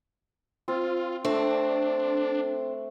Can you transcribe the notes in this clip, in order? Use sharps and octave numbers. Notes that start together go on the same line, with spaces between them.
C4 F4
A3 C4 D4